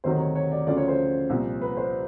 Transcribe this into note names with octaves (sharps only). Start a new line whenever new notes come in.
D2 C3 D#3 F#3 C5
C#5
C#5
D5
D2 C#3 F3 D5
C#5
C5
C2 A#2 F3
B4
C5